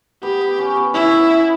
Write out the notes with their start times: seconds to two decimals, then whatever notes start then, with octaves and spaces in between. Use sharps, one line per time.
0.23 B3 G4 B4
0.41 B3 B4
0.58 C#4 C#5
0.76 B3 B4
0.94 C#4 E4 C#5
1.12 B3 B4
1.29 B3 B4
1.40 B4